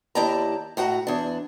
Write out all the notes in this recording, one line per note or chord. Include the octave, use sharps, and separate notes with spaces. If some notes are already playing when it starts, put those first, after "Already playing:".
D#2 E4 G4 D5 A5 A#5
A2 F#4 F#5 A#5
E2 D4